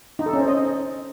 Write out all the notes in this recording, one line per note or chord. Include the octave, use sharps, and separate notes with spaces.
D#4
A4
C#4
C5
D#5